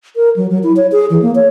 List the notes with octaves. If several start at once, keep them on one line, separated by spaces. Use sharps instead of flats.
A#4
F#3
F#3
E4
C#5
G#4
E3
A#3
C#5